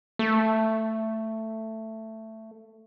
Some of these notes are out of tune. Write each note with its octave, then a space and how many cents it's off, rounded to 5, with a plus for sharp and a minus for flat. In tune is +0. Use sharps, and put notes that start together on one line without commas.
A3 +10